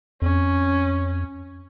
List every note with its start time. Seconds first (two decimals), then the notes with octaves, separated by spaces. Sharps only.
0.22 F2 C#4